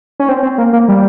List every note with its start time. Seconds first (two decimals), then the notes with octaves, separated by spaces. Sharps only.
0.20 C#4
0.28 C4
0.43 C4
0.58 A#3
0.73 A#3
0.88 G3